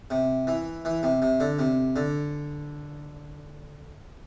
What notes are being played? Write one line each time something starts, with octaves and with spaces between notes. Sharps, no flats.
C3
E3
E3
C3
C3
D3
C3
D3